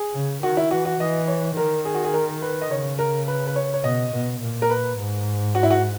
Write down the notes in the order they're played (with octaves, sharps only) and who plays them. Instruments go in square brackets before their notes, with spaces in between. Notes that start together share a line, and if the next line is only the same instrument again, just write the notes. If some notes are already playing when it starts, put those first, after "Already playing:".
Already playing: [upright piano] G#4
[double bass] C#3
[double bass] D#3 [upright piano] F#4
[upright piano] E4
[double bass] E3 [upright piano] F#4
[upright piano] F#4
[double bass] E3 [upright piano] D#5
[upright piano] C#5
[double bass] D#3 [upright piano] A#4
[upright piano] G#4
F#4
G#4
A#4
B4
D#5
[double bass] C#3 [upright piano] C#5
[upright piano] A#4
B4
B4
C#5
C#5
[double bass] B2 [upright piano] D#5
[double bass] B2
A#2
[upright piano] A#4
B4
[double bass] G#2
[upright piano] F#4
E4
F#4